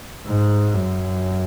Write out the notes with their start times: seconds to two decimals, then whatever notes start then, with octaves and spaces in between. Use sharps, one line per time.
0.26 G#2
0.74 F#2